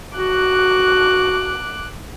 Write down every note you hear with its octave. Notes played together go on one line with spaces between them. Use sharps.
F#4 D6 F#6